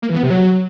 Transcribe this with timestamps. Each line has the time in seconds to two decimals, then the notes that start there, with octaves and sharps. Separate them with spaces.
0.02 A#3
0.09 E3
0.16 B3
0.23 C3
0.30 F#3